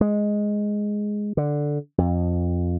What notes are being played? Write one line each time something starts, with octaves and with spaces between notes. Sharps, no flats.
G#3
D3
F2